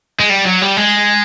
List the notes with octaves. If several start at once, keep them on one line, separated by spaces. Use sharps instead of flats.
G#3
G3
F#3
G3
G#3